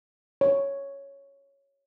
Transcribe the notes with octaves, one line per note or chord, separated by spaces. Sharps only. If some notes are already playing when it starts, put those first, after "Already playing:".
C#5